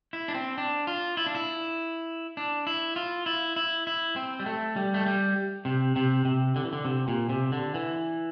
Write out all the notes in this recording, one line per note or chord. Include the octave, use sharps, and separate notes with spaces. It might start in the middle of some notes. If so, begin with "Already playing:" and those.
E4
D4
C4
D4
F4
E4
D4
E4
D4
E4
F4
E4
E4
E4
C4
G3
A3
G3
A3
G3
C3
C3
C3
D3
E3
D3
C3
A#2
C3
D3
E3